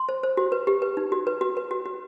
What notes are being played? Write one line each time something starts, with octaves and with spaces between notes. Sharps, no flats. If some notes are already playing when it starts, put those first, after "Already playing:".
Already playing: C6
C5
C5
F#4
B4
G4
B4
D#4
F#4
B4
F#4
B4
F#4
F#4